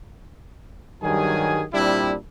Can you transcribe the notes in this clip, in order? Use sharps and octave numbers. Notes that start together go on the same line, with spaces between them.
G2 D#3 F#3 G3 G#4 G#5
A#2 G3 C4 D4 E4